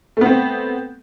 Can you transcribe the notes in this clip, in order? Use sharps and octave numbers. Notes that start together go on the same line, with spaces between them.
A3 B3 C4